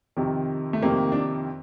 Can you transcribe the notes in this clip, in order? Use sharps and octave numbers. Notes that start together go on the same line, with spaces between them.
F2 C3 D#3
A3
F2 C3 D#3 A#3
D4